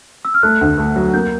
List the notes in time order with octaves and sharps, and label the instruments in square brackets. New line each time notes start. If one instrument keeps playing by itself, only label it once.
[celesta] E6
F6
[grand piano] A3 [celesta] F#6
[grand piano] D2
A3
F#3
[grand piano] A#3 [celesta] G6